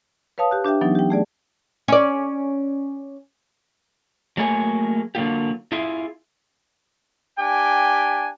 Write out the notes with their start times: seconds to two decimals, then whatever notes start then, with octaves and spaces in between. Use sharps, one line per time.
0.38 B4 C#5 F5 A5 D#6
0.51 G4 F#6
0.64 D4 G4 E5 G5
0.81 E3 F#3 B3 C#4 D#4
0.95 G4 G5
1.10 A3 G#4 D5 A5
1.88 C#4 D5
4.37 F#3 A3 A#3 G#4 C#5 G#5
5.15 D3 F#3 A#3 F4 G4
5.72 E4 F4 G#4 E5
7.38 D4 G4 G5 G#5